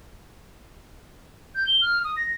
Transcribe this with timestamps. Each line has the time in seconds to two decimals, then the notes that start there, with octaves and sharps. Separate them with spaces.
1.55 G6
1.67 G7
1.82 F6
2.04 D#6
2.17 A#6